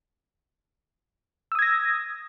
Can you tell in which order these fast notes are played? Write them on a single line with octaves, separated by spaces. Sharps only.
E6 D#6 G#6 A#6